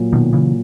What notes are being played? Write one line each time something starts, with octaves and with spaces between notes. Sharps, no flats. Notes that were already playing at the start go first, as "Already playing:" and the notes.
Already playing: A#2 F#3 A#3
B2 D#3
C#3 E3